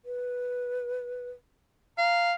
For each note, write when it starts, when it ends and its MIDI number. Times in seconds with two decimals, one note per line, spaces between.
0.05 1.30 71
1.98 2.34 77
1.98 2.28 82